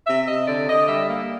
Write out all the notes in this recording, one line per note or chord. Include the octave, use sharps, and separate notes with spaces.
C3 E5
C3 D#5
D3 D5
D3 D#5
G3 E5
A#3